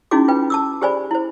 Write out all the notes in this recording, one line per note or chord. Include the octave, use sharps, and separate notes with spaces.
C#4 D#4 E4 F#4 G#4 D6
F4 B4 G5
A5 D6 E6
G4 G#4 C5 D5 G#5 B5
E4 C5